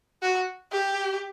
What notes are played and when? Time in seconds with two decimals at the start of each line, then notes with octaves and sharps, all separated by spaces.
0.22 F#4
0.72 G4